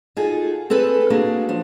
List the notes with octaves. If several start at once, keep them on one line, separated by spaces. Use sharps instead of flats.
D#4 F4 F#4 G#4 A4
C4 G#4 A4 B4
A#3 D4 F#4 G#4
F3 D4